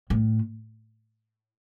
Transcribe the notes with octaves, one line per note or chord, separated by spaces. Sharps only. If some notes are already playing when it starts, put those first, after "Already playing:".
A2